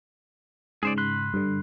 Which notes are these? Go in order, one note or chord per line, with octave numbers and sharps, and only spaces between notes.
G#2 C#3 G#4 C5 D5
B5 C6 F#6
G2 D3